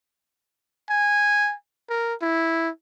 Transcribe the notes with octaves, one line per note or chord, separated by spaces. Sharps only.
G#5
A#4
E4